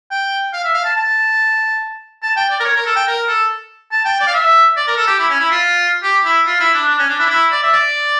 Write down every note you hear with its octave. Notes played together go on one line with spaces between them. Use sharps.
G5
F5
E5
F5
A5
A5
A5
G5
D5
A#4
C#5
A#4
A4
G5
A#4
A4
A5
G5
D5
F5
E5
D5
A#4
A4
G4
E4
C#4
E4
F4
G4
E4
F4
E4
D4
D4
C#4
D4
E4
D4
E4
D5
E5
D5